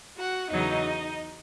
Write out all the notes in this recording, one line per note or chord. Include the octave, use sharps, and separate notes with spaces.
F#4 F#5
E2 C#3 F#3 D#4 D#5